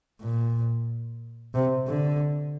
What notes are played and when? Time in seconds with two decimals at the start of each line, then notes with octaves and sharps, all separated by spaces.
0.21 A#2
1.54 C3
1.88 D3